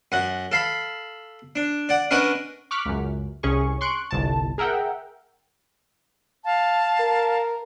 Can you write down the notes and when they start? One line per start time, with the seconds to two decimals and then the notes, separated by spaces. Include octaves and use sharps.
0.12 F#2 F#5
0.52 A4 F5 B5
1.56 D4
1.89 D5 F#5
2.11 C#4 D4 A#4 B4 D#5 F#5
2.71 C#6 D6 F6 F#6 B6
2.86 C#2 F#2
3.43 C2 C#4 G#4 C#6
3.81 C6 C#6 F#6 D7
4.11 G1 C2 A5
4.58 G#4 A#4 E5 F#5 G5
6.45 F5 A5
7.00 A#4